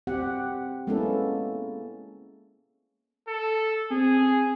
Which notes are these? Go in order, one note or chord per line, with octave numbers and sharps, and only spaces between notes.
C4 G4 F#5
G#3 A#3 B3 C#4 E4 A4
A4
C4 G#4